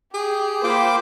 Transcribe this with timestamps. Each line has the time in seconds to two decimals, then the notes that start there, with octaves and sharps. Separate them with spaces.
0.14 G4 G#4
0.64 A#3 F4 C5 G5 B5 D6